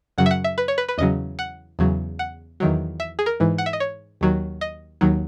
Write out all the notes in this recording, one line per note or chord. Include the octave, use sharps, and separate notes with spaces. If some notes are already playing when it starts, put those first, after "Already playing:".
F#2 C#3 F#3 F#5
E5
F#5
E5
B4
C#5
B4
B4
E2 C#3 F#3 D#5
F#5
E2 C#3 F#3
F#5
E2 D#3 F#3
E5
G#4
A#4
G#2 E3
F#5
E5
D#5
C#5
D#2 D#3 F#3
D#5
D#2 D#3 F#3